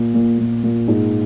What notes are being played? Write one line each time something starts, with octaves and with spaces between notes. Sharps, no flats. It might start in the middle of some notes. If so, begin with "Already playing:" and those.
Already playing: A#2
A#2
A#2
A#2
G#2